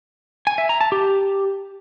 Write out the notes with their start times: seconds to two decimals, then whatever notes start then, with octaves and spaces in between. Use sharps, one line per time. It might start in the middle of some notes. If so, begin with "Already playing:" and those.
0.47 G#5
0.58 E5
0.69 A#5
0.81 A5
0.92 G4